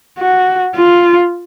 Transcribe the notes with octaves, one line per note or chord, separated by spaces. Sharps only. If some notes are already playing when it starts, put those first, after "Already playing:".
F#4
F4